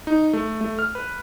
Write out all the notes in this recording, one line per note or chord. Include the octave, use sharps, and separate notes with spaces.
D#4
A3
A3
F6
B4